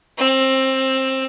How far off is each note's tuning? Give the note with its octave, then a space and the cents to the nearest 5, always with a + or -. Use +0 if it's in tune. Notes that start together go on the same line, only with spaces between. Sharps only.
C4 +20